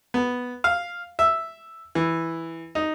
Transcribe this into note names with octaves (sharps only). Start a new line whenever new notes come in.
B3
F5
E5
E3
D#4